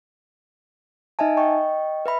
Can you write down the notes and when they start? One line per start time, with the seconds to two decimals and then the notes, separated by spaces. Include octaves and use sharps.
1.19 D#4 D#5 E5 G#5 A5
1.37 D#5 G5 C#6
2.06 B4 E5 B5